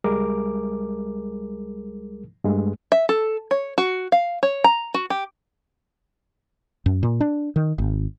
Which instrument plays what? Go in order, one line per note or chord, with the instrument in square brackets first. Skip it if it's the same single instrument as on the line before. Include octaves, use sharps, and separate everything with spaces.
[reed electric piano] C#2 G3 G#3 G#4 A#4 D6
G2 G#3 A3
[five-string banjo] E5
A4
C#5
F#4
F5
C#5
A#5
F#4
G4
[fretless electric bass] F#2
A#2
D4
D#3
G#1